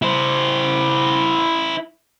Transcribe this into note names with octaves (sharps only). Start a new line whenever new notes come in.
E4 C5